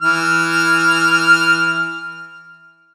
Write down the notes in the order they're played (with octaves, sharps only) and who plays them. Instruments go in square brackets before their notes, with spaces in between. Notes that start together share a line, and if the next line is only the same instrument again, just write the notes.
[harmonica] E3 F6